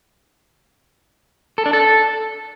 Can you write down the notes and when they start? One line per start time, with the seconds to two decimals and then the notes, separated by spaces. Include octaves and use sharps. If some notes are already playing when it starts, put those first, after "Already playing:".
1.58 A4
1.66 D4
1.73 A4